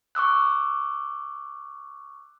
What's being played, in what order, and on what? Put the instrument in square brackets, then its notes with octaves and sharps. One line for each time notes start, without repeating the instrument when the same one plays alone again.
[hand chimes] C#6 D6 E6 F#6